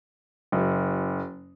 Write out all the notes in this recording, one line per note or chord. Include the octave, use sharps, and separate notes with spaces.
F#1